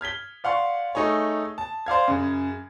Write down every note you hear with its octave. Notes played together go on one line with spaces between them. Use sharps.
F6 G#6 B6 G7
D5 F5 F#5 C6 C#6
A3 D#4 G#4 C#5
A5
C5 D5 F5 G#6
F#2 C#3